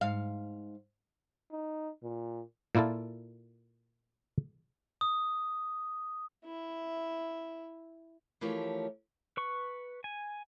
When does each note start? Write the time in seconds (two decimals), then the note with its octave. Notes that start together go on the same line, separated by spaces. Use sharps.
0.01 G#2 F5
1.51 D#4
2.03 A#2
2.75 A#2 A#3 E4 F4 A4
5.01 D#6
6.44 E4 E5
8.41 E3 F3 A3 G4 A#4 C#5
9.37 B4 C#6
10.04 G#5